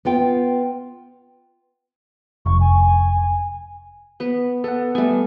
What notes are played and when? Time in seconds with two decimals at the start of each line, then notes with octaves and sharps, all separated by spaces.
0.05 B3 F4 G5
2.46 F1 C#6
2.60 G#5
4.20 B3 B4
4.64 B3 A4 F#5
4.95 G3 A3 B3 G#5